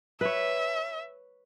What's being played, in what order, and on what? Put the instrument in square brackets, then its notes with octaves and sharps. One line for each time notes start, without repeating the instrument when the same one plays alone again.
[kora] B4 C#5 [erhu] E5